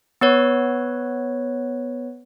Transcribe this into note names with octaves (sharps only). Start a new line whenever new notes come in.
B3 B4 C#5